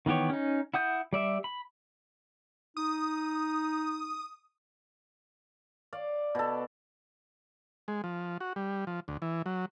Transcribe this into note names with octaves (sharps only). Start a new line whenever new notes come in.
D#3 E3 B3 G4 C#5
C#4 D#4
E4 F#5 D#6 G6
G3 D5 E5
B5
D#4 D#6
D5 F5
B2 A4
G#3
F3
F#4
G3
F3
D2
E3
F#3